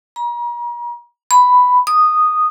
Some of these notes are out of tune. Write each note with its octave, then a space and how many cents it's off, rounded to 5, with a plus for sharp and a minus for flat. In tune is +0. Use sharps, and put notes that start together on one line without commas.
A#5 +40
B5 +5
D#6 -10